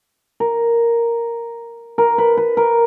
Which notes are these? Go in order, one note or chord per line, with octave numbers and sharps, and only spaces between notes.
A#4
A#4
B4
B4
A#4